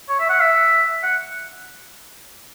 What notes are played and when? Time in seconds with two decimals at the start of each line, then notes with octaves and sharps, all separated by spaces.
0.09 C#5
0.20 E5
0.30 F#5
0.40 E5
1.04 F#5